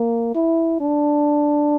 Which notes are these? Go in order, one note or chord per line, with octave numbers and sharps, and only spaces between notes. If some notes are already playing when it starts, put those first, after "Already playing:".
Already playing: A#3
E4
D4